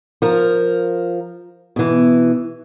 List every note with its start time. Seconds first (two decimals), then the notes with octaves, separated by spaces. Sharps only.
0.22 F3 A#4
1.76 B2 E3